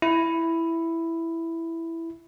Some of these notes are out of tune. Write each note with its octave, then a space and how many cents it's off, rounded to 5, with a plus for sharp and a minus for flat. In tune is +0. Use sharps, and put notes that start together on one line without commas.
E4 +5